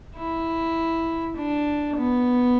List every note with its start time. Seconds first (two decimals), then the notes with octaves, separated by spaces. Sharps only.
0.15 E4
1.36 D4
1.97 B3